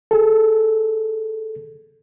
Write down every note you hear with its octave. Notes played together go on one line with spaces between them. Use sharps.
G#4 A4